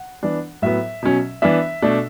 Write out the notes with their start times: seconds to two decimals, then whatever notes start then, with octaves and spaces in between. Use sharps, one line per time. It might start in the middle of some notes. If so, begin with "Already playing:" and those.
Already playing: F#5
0.23 E3 B3 D4
0.62 A2 F#3 B3 E5
1.03 B2 F#3 C#4
1.42 E3 B3 D4 E5
1.82 B2 A3 D4